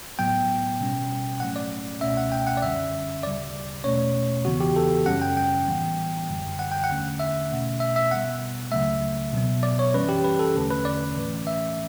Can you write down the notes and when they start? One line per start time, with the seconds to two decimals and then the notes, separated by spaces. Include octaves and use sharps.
0.19 A2 F#3 B3 G5
0.80 B2 G3 C#4
1.40 A2 F#3 A3 C#4 F#5
1.56 D5
2.01 C#2 B2 A3 C#4 E5
2.17 F#5
2.32 G5
2.47 F#5
2.57 D5
2.62 F#2 D3 G3 C#4 E5
3.23 D2 C#3 G3 D5
3.84 E2 B2 A3 C#4 C#5
4.45 E2 C#3 E3 B3 F#4
4.60 G4
4.76 A4
5.06 F#2 C#3 G3 C#4 F#5
5.22 G5
5.37 G5
5.67 A2 E3 G3 B3
6.29 F#2 D3 G3
6.59 F#5
6.72 G5
6.84 F#5
6.90 E2 D3 A3 C#4
7.19 E5
7.51 B2 A3 C#4
7.80 E5
7.96 E5
8.11 B2 G3 B3 F#5
8.72 C#2 C#3 F#3 A3 E5
9.33 B2 F#3 B3
9.63 D5
9.79 C#5
9.94 F#2 E3 G3 C#4 B4
10.09 G4
10.24 B4
10.39 A4
10.55 E2 D3 A3 C#4
10.71 B4
10.85 D5
11.17 A2 E3 A3 C#4
11.47 E5